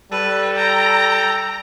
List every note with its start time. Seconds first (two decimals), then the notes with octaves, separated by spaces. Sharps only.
0.12 G3 A4 B4
0.57 G5 A#5